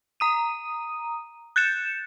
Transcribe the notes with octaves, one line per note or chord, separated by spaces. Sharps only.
A#5 D#6 D#7
F#6 G6 A6 C#7 E7